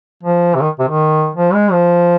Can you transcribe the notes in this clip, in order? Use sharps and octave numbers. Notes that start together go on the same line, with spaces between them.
F3
C3
D#3
C3
D#3
F3
G#3
F3